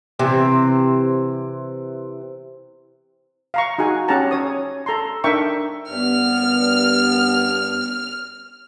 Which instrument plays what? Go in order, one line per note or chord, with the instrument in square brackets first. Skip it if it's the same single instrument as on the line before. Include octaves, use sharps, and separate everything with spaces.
[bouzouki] C3 E3 C4
[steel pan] F5 A#5 C#6
D#4 F#4 G#4 G#5
C#4 G4 G#4 F#5 A5 A#5
C#4 C#5 D#6
A4 A#5 C6
D4 D#4 A#4 E5 G5 C#6
[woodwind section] G2 B3 [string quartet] F6